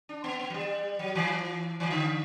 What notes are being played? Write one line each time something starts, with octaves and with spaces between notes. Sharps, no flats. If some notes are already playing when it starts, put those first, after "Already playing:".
D4
B3
B3
F#3
G3
F#3
E3
E3
D3